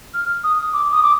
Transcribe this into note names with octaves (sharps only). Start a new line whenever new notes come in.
F6
D#6
D6
D#6
D6